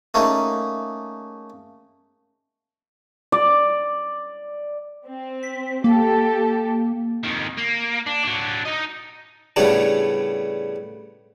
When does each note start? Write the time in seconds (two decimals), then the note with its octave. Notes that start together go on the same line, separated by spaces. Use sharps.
0.14 A3 A#3 C#4 D#4 G#4
3.32 D5
5.07 C4
5.43 B6
5.84 A#3 G4 A4
7.24 F2 D#3
7.58 A#3
8.07 D4
8.25 F#3 D4
8.66 D#4 D#5
9.56 A2 C#3 G3 A3 B3 D4